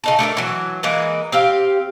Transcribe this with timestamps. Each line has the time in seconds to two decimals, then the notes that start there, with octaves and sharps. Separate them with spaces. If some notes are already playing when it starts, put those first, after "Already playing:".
0.04 C#3 D#4 A4
0.19 A3 D4 A4 A#4
0.37 E3 F#3
0.83 E3 G#3 A#3 B4
1.32 C4 G4 F5